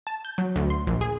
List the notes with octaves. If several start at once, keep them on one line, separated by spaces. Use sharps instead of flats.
A5
G6
F#3
D2
C6
A#1
G#4